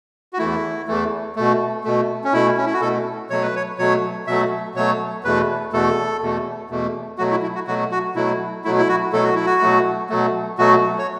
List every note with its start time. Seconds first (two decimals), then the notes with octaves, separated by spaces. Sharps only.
0.33 F#4
0.38 E2 E3 A3 E4
0.87 E2 E3 A3
1.36 B2 A3
1.84 B2 A3
2.24 C#4
2.33 B2 A3 E4
2.57 C#4
2.66 E4
2.73 F#4
2.81 B2 A3 A4
3.30 B2 F#3 A3 C#5
3.42 B4
3.56 C#5
3.79 B2 F#3 A3 C#5
4.27 B2 F#3 A3 E5
4.75 B2 F#3 A3 C#5
5.24 E2 B2 A3 B4
5.73 E2 B2 A3 A4
6.21 E2 B2 A3
6.70 E2 B2 A3
7.18 B2 F#3 A3 F#4
7.31 E4
7.43 E4
7.55 F#4
7.67 B2 F#3 A3 F#4
7.91 F#4
8.15 B2 F#3 A3 E4
8.64 B2 F#3 A3 E4
8.78 E4
8.88 F#4
9.13 B2 F#3 A3 A4
9.24 F#4
9.35 E4
9.46 F#4
9.61 B2 F#3 A3
10.09 B2 F#3 A3
10.58 B2 F#3 A3 F#4
10.99 C#5